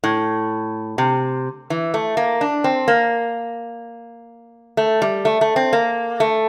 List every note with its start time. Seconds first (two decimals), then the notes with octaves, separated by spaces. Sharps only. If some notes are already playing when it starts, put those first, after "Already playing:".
0.04 A2
0.98 C3
1.70 E3
1.94 A3
2.17 A#3
2.41 D4
2.64 C4
2.88 A#3
4.77 A3
5.02 G3
5.25 A3
5.41 A3
5.56 C4
5.73 A#3
6.20 A3